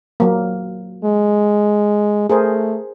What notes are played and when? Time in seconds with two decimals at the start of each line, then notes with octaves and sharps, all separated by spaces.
0.20 F#3 A#3
1.05 G#3
2.30 A3 G#4 A#4 C5